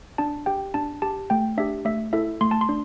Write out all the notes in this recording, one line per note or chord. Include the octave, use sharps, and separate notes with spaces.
D4 A5
G4 G5
D4 A5
G4 A5
A3 G5
D4 G4 E5
A3 E5
E4 A4 E5
A3 C6
A5
C6
D4